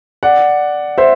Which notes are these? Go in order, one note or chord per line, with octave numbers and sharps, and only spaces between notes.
D5 F#5
C5 E5